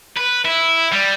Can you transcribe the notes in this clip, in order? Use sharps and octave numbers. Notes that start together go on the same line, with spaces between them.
B4
E4
G3